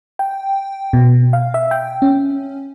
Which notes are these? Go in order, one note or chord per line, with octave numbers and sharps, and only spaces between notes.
G5
B2
F5
E5
G5
C#4